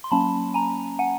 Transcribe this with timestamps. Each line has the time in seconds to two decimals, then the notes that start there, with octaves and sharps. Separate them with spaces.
0.04 C6
0.11 F#3 A#3 C#4 A5 B5
0.54 G#5 A#5
0.99 F#5 G#5